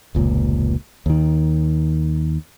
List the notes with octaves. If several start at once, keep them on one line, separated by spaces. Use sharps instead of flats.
F1 C#2 A#2
D#2 D#3